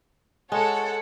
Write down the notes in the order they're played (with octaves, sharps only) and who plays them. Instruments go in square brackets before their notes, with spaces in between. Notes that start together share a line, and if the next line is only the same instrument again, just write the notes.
[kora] G#3 [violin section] A4 C#5 F#5